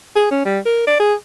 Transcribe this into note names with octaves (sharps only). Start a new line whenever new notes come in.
G#4
C#4
G3
A#4
D5
G#4